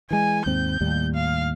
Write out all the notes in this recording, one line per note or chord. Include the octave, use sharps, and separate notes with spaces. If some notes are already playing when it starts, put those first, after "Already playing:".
E3 G#3 G#5
D#2 G#2 C4 G6
D#2 A2 G3
F5